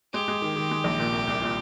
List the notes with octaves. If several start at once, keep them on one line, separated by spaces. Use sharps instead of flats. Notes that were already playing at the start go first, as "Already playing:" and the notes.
G#3 G4
G#3
D#3
D#3
G#3
A#1
A#2
C2
C2
A#2